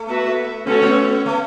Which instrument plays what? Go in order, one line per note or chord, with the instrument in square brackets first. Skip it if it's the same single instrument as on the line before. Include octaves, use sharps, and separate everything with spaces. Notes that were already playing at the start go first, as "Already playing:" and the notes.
Already playing: [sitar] A3
[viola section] B3 F#4 B4 E5
[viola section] A3 C#4 F#4 A4 C#5 [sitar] B3
[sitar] B3
A3